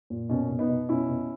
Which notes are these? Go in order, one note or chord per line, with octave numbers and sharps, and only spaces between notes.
A#2
B2 A#3 C#4
B2
B3 D#4
B2
B2 C#4 E4
B2